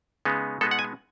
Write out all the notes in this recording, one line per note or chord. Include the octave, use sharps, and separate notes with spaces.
C#3 G#3 B3 D#4
B2 G#3 B3 D#4 A4
F#5
G#5